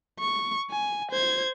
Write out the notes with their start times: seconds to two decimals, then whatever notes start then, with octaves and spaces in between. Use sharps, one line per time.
0.20 C#6
0.71 G#5
1.11 C5 G#6